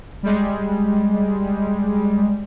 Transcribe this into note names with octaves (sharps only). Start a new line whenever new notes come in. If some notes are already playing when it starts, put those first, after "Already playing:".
G3 G#3